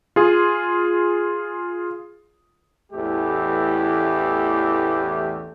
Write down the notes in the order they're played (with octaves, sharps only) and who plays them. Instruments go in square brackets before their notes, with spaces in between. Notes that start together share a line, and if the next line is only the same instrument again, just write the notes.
[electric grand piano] F4 G#4
[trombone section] A1 E2 E3 A3 G4